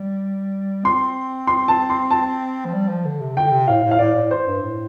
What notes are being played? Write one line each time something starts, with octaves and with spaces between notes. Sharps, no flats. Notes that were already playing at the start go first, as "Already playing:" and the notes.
Already playing: G3
C4 C6
C6
A5
C6
A5
F3
G3
F3
D3
C3
D3 G5
C3
A2 F5
A2
F5
A2 D5
A2
C5
G2
A2